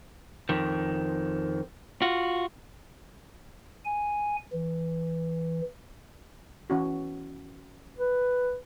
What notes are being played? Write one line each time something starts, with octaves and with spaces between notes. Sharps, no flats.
F2 D#3
F4 F#4
G#5
E3
E3 C#4 F#4
B4